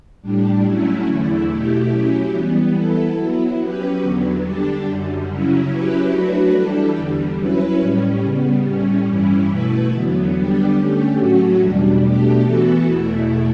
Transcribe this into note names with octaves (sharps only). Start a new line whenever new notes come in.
A2 G3 D4
F#3 A3 C#4 E4
E2 D3 A3 E4
B2 A3 E4 G4
F#3 C#4 E4 G4
E3 G3 B3
E3 B3 E4 A4
F#3 B3 E4
F#3 C#4 G4 B4
E2 D3 F#3 B3
D3 G3 D4 G4
F#2 D3 G3
C#3 F#3 C#4 E4
F#3 C#4 E4 G4 B4
F#3 A3 D4 F#4 B4
E3 G3 D4 A4
E2 D3 G3
F#3 C#4 E4 B4
A2 G3 C#4
C#3 G3 B3
A2 G3 C#4
G2 E3 G3 C#4 E4
B2 A3 E4 B4
E2 D3 F#3 B3
D3 G3 B3 D4 G4
D3 A3 C#4 G4
A2 F#3 A3 C#4 F#4
E2 B2 G3 D4
B2 A3 D4 G4
E3 B3 F#4 A4
E2 B2 A3 E4